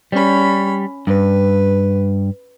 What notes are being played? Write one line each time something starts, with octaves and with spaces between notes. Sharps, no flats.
G3 C#4 B5
G2 B4